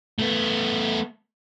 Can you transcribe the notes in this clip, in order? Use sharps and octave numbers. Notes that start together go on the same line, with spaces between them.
A3 B3